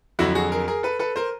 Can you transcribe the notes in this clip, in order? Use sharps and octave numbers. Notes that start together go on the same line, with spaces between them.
F2 D3 F#3 E4 F#4
F#4 G#4
G#4 A#4
G#4 A#4
A4 B4
A4 B4
A#4 C5